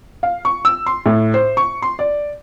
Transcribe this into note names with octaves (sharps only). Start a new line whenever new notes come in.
F5
C#6
E6
C6
A2
C5
C#6
C6
D5